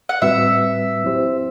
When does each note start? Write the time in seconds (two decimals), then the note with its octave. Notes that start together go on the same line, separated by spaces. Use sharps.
0.09 F#5
0.22 A2 G3 C4 F#4 B4 E5
1.04 F#3 C4 E4 G4 C5